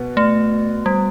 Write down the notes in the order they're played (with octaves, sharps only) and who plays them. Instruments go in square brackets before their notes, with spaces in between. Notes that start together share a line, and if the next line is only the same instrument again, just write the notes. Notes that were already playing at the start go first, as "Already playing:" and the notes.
Already playing: [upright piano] B2 B3
[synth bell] A3
G3